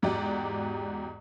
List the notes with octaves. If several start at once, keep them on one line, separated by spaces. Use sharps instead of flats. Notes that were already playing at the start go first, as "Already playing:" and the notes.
E2 G#2 F#4 G4 D5